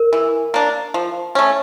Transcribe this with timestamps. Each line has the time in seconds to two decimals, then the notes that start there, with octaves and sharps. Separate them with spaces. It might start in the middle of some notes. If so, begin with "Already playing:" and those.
Already playing: A#4
0.13 E3
0.54 A#3 D4
0.94 F3
1.35 A3 C#4